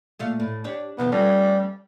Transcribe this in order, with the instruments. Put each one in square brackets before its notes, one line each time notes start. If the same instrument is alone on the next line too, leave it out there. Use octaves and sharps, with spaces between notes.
[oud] A#2 A3 F5
A2
D4 G4 C#5
[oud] B2 D#3 F3 [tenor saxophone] B3
[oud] F3 A3 C#4 [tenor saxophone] G3